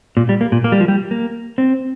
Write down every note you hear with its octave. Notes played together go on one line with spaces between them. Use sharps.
A#2
G3
A#3
A#2
A#3
G3
F3
G3
A#3
C4